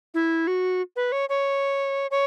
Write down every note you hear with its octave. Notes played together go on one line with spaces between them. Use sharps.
E4
F#4
B4
C#5
C#5
C#5